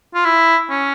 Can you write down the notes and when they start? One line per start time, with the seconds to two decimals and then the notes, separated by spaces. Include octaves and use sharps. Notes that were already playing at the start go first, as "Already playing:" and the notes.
0.15 F4
0.25 E4
0.70 C#4